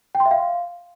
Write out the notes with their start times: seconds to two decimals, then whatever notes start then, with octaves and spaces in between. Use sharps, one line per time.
0.15 G5
0.20 C6
0.26 E5
0.31 F5